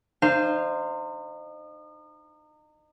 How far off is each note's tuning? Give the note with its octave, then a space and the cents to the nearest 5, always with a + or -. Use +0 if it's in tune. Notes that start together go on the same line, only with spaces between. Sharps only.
D#4 -35 C5 +0 F5 -25